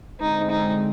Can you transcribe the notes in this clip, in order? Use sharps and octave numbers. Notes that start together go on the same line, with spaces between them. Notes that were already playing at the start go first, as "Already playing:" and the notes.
D3 G#3 C4 D#4
D#4